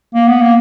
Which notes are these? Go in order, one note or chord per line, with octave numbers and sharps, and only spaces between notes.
A#3
B3
A#3